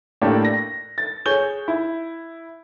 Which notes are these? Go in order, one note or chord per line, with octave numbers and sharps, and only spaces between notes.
A2 A#3 D4 G4 A4
A#6
A6
G#4 C#5 G6 G7
E4